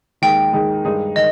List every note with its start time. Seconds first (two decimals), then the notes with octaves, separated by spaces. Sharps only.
0.22 D#2 D#3 G#3 D#4 G#4 G5
0.53 D#2 D#3 G#3 D#4 G#4
0.85 G2 D#3 G#3 D#4 G#4
1.16 D#3 D#5